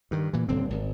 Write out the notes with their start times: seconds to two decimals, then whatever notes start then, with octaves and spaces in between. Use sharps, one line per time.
0.11 G2 D#3
0.33 A#2 E3
0.49 D#1 G2 D3 C4
0.70 G#1